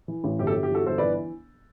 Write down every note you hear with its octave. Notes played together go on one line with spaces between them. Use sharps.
E3
A1
G1 G4
A4
G4
G1
G4
E3 F#4 A4
G1 A4 C5
E3 B4 D5